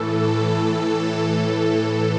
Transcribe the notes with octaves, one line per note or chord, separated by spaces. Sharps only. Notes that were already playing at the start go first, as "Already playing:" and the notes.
Already playing: A2 E3 A4
A4